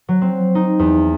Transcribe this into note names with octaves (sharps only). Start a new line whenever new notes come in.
F#3
C4
D#4
E2